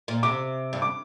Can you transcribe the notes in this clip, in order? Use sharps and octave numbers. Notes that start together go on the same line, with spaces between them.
A#2
C3 D6
G2
D6